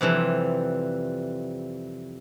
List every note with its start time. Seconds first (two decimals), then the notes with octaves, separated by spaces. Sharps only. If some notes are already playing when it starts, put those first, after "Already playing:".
0.01 F2 C3 E3 G3